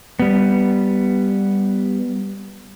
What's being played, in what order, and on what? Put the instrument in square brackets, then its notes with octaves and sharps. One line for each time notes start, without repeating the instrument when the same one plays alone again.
[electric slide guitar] G3 B3